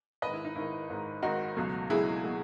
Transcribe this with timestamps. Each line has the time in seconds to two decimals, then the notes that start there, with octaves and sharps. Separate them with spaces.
0.22 G#1 G#2 D#3 B4 D#5
0.33 E4
0.45 D#4
0.56 G#1 G#2 D#3 E4
0.89 G#1 G#2 D#3
1.23 G#1 G#2 D#3 D#4 F#4
1.57 C#2 B2 F#3 A3
1.89 C#2 B2 F#3 A3 E4 G#4
2.24 B2 F#3 A3